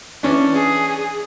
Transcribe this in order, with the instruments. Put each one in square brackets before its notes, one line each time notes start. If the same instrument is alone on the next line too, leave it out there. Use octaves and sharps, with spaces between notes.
[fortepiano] E3 C#4 D4
[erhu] G#4